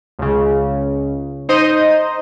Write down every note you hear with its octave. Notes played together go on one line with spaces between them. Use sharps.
C#2 C#3
D#4 C5 D#5 D#6